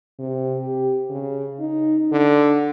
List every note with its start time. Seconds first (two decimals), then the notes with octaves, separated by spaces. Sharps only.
0.19 C3
0.60 G4
1.10 C#3
1.60 D#4
2.12 D3